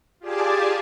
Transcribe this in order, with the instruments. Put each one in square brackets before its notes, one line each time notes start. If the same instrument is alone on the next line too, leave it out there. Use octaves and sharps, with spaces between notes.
[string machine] F4 G4 G#4 D5 G#5 A5